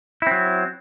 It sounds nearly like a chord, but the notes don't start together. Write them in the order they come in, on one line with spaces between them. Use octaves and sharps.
E4 C4 F#3